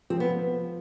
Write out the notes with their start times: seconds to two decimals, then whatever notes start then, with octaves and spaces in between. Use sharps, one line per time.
0.10 F3 C4
0.20 B3